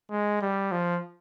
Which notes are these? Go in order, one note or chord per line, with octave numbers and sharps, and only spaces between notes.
G#3
G3
F3